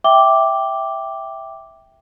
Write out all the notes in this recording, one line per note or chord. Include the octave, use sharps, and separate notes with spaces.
E5 G5 D6 G7